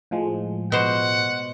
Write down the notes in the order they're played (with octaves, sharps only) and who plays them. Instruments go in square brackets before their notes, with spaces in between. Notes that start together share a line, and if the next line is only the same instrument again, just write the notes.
[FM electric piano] A2 F3 G#3
[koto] B2 C5 [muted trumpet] F#5